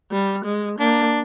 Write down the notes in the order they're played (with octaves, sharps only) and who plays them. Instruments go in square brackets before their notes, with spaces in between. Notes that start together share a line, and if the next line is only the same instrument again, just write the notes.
[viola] G3
G#3
[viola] A#3 [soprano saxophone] D4